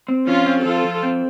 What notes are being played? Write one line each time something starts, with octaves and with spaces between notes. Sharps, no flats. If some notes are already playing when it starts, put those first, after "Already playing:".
C4
F3 C#4 F4
C4
F3 F4 A4
F3
C4